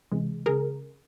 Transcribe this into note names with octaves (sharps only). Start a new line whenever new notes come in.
C#2 C3 E3 G#3
C#3 G#4 A#4